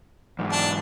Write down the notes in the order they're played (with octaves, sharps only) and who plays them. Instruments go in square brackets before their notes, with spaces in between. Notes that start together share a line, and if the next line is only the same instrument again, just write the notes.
[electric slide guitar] E2 G#2
[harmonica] D4 A5